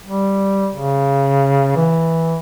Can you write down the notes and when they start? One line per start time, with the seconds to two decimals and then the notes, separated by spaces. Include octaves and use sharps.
0.06 G3
0.74 C#3
1.76 E3